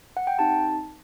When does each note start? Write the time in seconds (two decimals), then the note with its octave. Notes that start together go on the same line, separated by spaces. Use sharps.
0.17 F#5
0.27 G5
0.39 C4 D#4 G4 A5